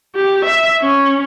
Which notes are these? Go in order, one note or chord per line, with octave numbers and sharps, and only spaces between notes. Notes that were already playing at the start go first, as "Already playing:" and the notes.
G4
E5
C#4